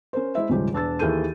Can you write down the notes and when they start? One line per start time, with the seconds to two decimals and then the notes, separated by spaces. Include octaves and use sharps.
0.13 C#4 A#4 C5
0.35 G#3 E4 C5 E5
0.49 D#1 G#2 C#3 F3 G3 G4
0.73 E1 D4 E6 A6
0.99 D#2 E3 G#4 A4 G6 D#7